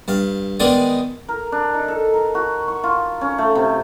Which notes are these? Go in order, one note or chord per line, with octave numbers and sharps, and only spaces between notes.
G2 F5
D#3 G#3 B3 D5 G#5
A#4
D4
D#4
A4
A#4
F#4
C#6
F4
C#4
A3
C3